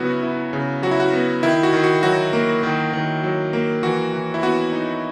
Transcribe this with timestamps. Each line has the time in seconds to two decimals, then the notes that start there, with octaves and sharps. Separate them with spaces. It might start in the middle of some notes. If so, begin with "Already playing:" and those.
Already playing: C#3 F#3 B3 E4 F#4
0.23 E4
0.53 C#3
0.82 F#3 F#4
0.91 E4
1.00 F#4
1.13 B3
1.43 D#3 E4
1.63 F#4
1.73 D#3
1.84 F#4
2.03 F#3 F#4
2.33 A#3
2.63 D#3
2.93 D#3
3.24 F#3
3.53 A#3
3.83 E3 F#4
4.13 E3
4.34 E4
4.43 B3 F#4
4.72 D#4